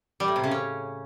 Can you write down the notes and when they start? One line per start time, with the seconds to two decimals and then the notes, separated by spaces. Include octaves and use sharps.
0.20 G3
0.28 A2
0.36 C3
0.44 C#3
0.51 C#4